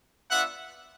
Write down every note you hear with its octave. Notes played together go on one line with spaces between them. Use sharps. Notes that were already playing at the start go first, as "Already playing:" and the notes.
B3 D4 F4 E5 F#5